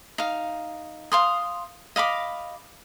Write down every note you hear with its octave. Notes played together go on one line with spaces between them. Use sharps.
D#4 F5
F5 C6 D#6
D#5 F5 B5 D6